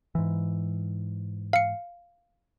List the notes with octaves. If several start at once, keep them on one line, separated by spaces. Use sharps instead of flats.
G#2 E3
F5 C#7